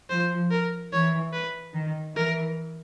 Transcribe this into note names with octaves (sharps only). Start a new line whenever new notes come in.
F3 C5
A#4
E3 C#5
B4
D#3
E3 A#4